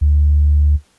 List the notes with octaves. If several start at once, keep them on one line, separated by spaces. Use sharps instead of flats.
D2